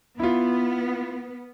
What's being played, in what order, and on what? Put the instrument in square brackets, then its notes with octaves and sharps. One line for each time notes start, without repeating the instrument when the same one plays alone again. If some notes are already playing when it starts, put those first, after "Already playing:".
[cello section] B3 [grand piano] E4 F4